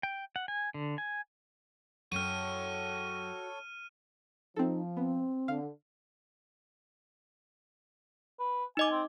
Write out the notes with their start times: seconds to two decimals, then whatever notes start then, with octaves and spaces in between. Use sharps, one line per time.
0.03 G5
0.36 F#5
0.48 G#5
0.74 D3
0.98 G#5
2.12 F#2 F#3 F#4 A4 C#5 G5 F6 D#7
4.56 F3 C4 D#4 A4
4.97 B3 C4
5.48 D3 F5
8.39 B4
8.77 D#4 D#5 G#5 D6
8.91 C4